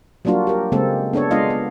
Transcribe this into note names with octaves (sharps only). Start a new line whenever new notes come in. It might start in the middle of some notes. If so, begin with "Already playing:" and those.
F#3 G3 A#3 D4 F4 F#4
G4 A#4
C#3 G#3 A#3 C4 A4
B3 D4 A4 C#5
G#3 B3 D4 F4 D#5 F5
B3